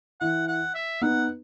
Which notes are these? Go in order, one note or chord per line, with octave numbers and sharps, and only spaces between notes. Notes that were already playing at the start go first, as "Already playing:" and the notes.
E3 F#5
F#5
E5
B3 D#4 F#5